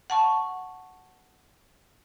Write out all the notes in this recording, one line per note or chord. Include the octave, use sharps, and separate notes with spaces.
F#5 A5 C#6